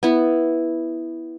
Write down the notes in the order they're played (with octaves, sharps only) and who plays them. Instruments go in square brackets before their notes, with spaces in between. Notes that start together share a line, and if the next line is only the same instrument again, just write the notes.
[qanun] B3 E4